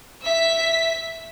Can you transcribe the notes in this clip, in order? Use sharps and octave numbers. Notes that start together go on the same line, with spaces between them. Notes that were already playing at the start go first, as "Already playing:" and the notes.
E5 B6